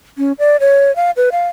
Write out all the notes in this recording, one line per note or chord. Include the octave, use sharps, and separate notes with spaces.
C#4
D5
C#5
F5
B4
F5